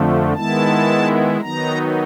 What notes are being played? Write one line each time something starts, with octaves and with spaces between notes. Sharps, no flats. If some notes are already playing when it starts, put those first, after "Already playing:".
Already playing: F2 D3 F3 A3
D#3 G#3 B3 E4 A5
D#3 F#3 B3 D#4 A#5